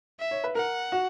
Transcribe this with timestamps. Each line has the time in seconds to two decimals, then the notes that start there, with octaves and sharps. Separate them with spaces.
0.19 E5
0.31 C#5
0.44 B4
0.55 A#4 F#5
0.92 F#4